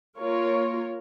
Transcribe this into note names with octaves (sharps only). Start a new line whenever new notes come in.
A#3 F4 A#4 C#5